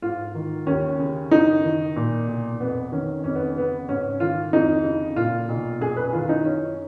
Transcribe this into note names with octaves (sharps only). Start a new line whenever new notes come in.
G#2 F4
D#3
D#2 C#4
C#3
F#2 D#4
D#3
A#2
B1
F2 B3
D#3 C#4
F2 C#4
B3
C#3 B3
G#2 C#4
D#3 F4
F2 D#4
C#3
A#2 F4
B1
F#2 G#4
B4
D#3 F4
D#4
F#2 C#4